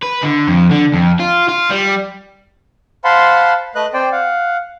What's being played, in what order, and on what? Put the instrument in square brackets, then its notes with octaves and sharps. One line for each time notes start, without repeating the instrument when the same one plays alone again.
[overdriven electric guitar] B4
D3
F2
D3
F2
F4
F4
G3
[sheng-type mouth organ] C5 F5 F#5 A5 B5 C6
A3 B4 D#5 F#6
C4 C5 D5 G5
F5 F#5